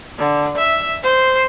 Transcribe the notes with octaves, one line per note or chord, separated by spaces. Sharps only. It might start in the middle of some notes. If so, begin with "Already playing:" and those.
D3
E5
C5